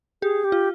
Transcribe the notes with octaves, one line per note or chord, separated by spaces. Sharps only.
G4 G#4
G4
F4